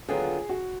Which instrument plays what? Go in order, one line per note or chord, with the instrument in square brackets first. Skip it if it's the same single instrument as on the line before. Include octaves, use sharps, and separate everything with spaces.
[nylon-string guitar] D#2 D3 F#3 B3 F4 [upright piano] G#4
[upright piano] F#4